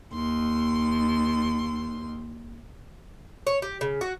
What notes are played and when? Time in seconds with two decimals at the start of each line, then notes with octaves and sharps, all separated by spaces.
0.13 D#2 C6
3.47 C#5
3.62 G4
3.81 C#3
4.01 F#4